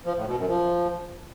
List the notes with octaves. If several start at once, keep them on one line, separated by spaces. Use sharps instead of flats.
F3
A2
B2
F#2
F3